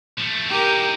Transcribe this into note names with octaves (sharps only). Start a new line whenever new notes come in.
F3 A3
D#4 E4 G4 A#4